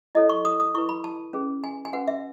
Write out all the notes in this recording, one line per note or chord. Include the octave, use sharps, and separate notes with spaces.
E4 A4 C#5 D#5
C#6
D#6
D#6
E4 B4 C#6
B5
A5
C#4 G#4 B4
G#5
G#5
C#4 F#4 B4 F#5
E5